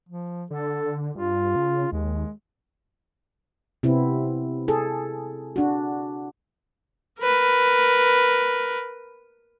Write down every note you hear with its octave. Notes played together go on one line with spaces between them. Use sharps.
F3
D3 A4
G2 F4
C#3
D#2 G#3
C3 B3 C4 E4
G#4 A4
D4 F#4
A#4 B4